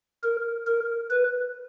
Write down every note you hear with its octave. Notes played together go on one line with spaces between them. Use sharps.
A#4
A#4
B4